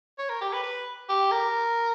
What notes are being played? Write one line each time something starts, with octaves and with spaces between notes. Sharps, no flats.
C#5
A#4
G4
B4
B4
G4
A#4